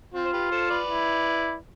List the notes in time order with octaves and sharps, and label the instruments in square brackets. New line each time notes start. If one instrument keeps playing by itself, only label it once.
[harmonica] C4 [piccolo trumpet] F4
[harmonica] C5
G4 B4
A4 C5
B4 D5
[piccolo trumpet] E4